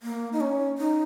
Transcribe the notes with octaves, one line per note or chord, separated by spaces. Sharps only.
A#3
D#4
C#4
D#4